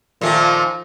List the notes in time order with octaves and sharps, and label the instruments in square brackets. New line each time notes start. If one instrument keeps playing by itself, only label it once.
[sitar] A#2 D#3 A3 [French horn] F3